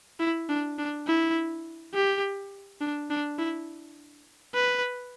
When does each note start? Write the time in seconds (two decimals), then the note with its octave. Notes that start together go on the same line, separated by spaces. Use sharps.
0.20 E4
0.49 D4
0.78 D4
1.07 E4
1.94 G4
2.81 D4
3.10 D4
3.38 E4
4.54 B4